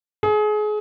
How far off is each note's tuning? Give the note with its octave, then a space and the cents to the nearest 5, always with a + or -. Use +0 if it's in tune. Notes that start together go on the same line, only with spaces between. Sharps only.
G#4 +30